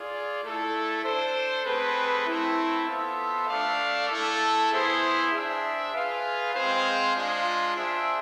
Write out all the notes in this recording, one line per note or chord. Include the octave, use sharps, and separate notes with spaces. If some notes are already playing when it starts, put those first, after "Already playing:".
Already playing: F4 G#4 D5
A3 E4 A4
D4 A4 C5
A3 C4 G#4 B4
A3 C4 E4
B3 F4 A4 C5 E5
A3 D4 A4 D5 F5
A3 E4 A4
B3 E4 G#4 C5 E5
D4 G#4 C5 E5
F4 G#4 B4 F5
G#3 C4 G#4 C5 F5
G#3 D4 F4
D4 G#4 C5 E5